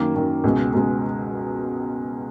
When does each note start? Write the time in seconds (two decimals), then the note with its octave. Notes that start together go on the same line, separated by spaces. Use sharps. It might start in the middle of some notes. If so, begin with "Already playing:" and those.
Already playing: F#2 D#3 A#3
0.15 F#2 D#3 A#3
0.44 C#2 B2 G#3
0.74 C#2 B2 G#3